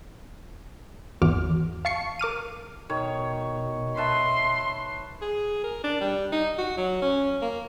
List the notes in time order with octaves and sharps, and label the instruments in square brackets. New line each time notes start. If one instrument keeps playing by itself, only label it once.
[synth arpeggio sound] G#1 E2 F#4 D6 F6
F5 A5 C#6 C7 C#7
A#4 D6 F6 D#7
[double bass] B2 [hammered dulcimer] D#3 C#5
[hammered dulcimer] B4 E5 A5 [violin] C6
[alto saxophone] G#4
A#4
D4
G3
D#4
F#4
F#3
C#4
A#3